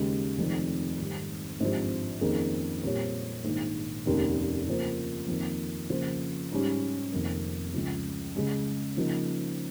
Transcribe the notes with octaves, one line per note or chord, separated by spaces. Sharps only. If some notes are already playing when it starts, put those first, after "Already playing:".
Already playing: D#2 C#3 G#3 D#4
F1 F2 D#3
G#2 D#3 G3
G#1 G2 F3 C4 G4
F2 D#3 A#3 C#4 G#4
A#2 G3 C4 G4 C#5
A#1 G#2 D#3
F1 D#2 D#3 A#3 C#4
C#3 F3 A#3 F4 C5
F2 D#3 A#3
C#3 F3 A#3 F4 C5
G#2 G3 C#4
F1 F2 D#3 A#3
C#2 C#3 F3
C#3 G#3 C#4
C#3 F3 A#3 D#4